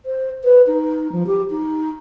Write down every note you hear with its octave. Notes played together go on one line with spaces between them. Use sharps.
C5
B4
D#4
F3
G4
D#4